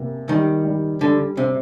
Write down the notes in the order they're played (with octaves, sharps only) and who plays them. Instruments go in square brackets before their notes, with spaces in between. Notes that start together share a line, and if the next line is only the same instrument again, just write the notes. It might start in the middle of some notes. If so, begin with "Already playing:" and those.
Already playing: [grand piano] C3 A#3
[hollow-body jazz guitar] D#3 [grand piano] G3
[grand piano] G3
[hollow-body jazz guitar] D3 [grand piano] G3
[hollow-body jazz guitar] C3 [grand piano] C4